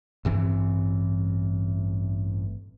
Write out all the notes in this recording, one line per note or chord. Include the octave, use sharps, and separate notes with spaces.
A1 G2 E3 C4